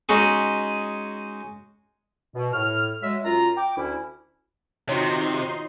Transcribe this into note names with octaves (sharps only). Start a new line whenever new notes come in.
G#3 C#4 D#4 F#4 G#4
B2
A2 F6
F#3 G#3 E5
F#2 F4 A#5
G5 D6
D2 C#4 E4
C3 D#3 D#4 F4 F#4 C#5 C6